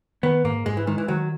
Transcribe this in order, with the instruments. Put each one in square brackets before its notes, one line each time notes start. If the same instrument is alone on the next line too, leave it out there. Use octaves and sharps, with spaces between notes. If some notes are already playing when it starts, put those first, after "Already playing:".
[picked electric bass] D#3 [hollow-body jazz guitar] B3
[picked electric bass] G#2 [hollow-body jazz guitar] A#3
[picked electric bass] G#2 [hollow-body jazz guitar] G#3
[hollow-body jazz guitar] E3
[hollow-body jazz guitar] D#3 [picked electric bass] G#3
[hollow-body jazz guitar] E3
[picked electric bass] D#3 [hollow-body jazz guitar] F#3